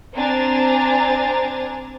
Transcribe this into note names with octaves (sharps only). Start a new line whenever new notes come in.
C4 D4 G#5 A#5 A6